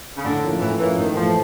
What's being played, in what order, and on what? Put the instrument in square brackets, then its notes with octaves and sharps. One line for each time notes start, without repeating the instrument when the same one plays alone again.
[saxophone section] C#3
[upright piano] A2 [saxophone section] D3
[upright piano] F3 A#3 C#4 E4
[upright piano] A2 [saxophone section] E3
[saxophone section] E3 [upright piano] F3 A#3 C#4 E4
[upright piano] A2 [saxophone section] D#3
[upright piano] E3 A3 [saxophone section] F3